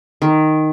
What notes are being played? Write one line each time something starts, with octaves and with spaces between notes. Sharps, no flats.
D#3